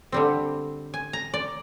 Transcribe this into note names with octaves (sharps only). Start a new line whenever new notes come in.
D3 G3 C4
G#5
A#5
D5